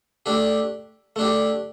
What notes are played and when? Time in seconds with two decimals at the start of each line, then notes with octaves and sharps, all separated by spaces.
0.26 A3 D4 G4
1.16 A3 D4 G4